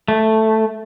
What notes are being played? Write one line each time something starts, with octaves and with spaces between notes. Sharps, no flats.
A3